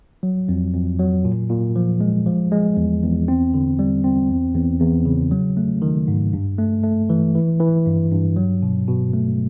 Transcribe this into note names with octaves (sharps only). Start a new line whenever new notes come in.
F#3
F2
F2
F#3
A#2
A#2
F3
G#3
F3
G#3
E2
E2
C4
D3
G3
C4
E2
E2
E2
C#3
F#3
A3
D#3
G#2
G2
A3
A3
E3
E3
E3
G2
G2
F#3
B2
B2
A3